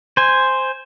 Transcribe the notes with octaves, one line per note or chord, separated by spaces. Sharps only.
C5 G#5